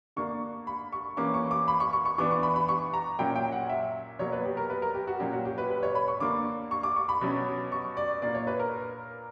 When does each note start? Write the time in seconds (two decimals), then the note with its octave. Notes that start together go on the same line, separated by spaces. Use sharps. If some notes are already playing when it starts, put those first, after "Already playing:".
0.16 D3 A#3 D4 C#6
0.67 B5
0.93 C#6
1.17 E3 A#3 C#4 D6
1.34 C#6
1.51 D6
1.68 B5
1.80 C#6
1.93 C#6
2.05 C#6
2.18 E3 B3 D4 D6
2.31 C#6
2.43 B5
2.56 B5
2.68 C#6
2.94 A#5
3.19 A#2 F#3 C#4 G5
3.35 G5
3.52 F#5
3.69 E5
4.19 B2 F#3 A#3 C#5
4.32 B4
4.45 G4
4.57 A#4
4.70 B4
4.82 A#4
4.94 G4
5.07 F#4
5.20 A#2 F#3 C#4 G4
5.33 F#4
5.45 G4
5.58 B4
5.70 B4
5.83 C#5
5.95 B5
6.08 C#6
6.20 D3 A#3 D4 D6
6.71 C#6
6.83 D6
6.96 C#6
7.09 B5
7.21 B2 F#3 C#4
7.72 C#6
7.97 D5
8.22 A#2 A#3 D4 D5
8.35 C#5
8.47 B4
8.59 A#4